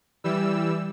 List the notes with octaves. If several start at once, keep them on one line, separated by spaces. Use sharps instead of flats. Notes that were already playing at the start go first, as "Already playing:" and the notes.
E3 G3 E6